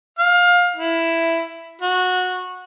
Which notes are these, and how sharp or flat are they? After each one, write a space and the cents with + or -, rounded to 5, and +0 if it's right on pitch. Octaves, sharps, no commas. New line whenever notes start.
F5 +25
E4 +5
F#4 -20